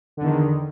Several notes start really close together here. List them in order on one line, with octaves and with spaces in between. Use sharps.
D3 E2 D#3